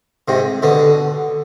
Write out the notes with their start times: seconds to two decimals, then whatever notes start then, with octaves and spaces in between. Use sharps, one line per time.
0.28 G#2 C3
0.62 B2 D3